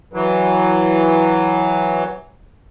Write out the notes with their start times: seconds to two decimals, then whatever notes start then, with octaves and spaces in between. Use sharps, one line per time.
0.13 E3 F#3